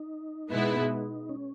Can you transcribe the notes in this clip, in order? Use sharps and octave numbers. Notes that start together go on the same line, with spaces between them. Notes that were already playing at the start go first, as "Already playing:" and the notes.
Already playing: D#4
B2 G#3 B3 E4
C#4